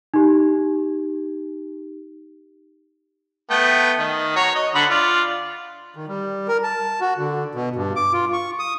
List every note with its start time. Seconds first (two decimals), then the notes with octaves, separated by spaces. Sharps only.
0.14 D#4 G4
3.51 A3 B3 G5
3.99 D#3
4.36 F#4 C#5 A#5
4.55 D#5
4.75 D3 F#5 B5
4.90 F4 D5
5.96 D#3
6.08 G3
6.48 A#4
6.63 A5
7.01 F#4
7.18 D3
7.55 B2
7.76 G2
7.96 D6
8.13 F4
8.33 C#6
8.59 D#6